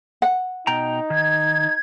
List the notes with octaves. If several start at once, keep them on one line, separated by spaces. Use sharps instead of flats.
F#5
B2 D#4 G5 A#5
D#3 G#6